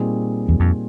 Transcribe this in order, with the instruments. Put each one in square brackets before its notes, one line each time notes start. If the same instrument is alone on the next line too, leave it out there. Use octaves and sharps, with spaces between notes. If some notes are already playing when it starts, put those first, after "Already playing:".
Already playing: [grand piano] A#2 G3 C4 D#4 G#4
[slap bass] E2
F2